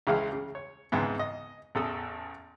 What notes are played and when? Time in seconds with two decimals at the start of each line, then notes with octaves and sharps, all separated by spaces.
0.07 C#2 C#3 E3 G#3 F5
0.33 C#3
0.55 C#5
0.92 G#1 C#2 G#2 E3 B3
1.19 D#5
1.75 A1 E2 A4 D#6